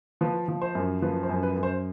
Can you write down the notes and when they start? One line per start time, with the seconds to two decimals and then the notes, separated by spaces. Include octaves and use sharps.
0.21 F3 B4
0.48 F3
0.62 C5
0.75 F#2
1.02 F3 B4
1.23 C5
1.29 F#2
1.43 B4
1.56 F#2
1.63 C5